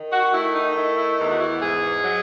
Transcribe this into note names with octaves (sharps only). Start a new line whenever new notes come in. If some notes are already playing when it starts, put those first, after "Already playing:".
Already playing: D#3
F#4
A3 E4
D#4
D#3 E4
E4
E2 D#4
F#4
E4
G#2 G#4
F#3